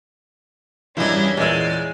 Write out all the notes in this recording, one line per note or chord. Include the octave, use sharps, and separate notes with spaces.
F#2 E3 F3 G3 C#4 D4 E4 D#5
E2 A#2 G#3 E4 D5 E5 G#6